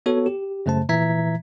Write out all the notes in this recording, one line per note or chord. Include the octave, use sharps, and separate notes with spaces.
B3 F#4 A4 C#5
G4
F#2 C#3 A3 C5 A5
A#2 E3 E5 A#5 G#6 B6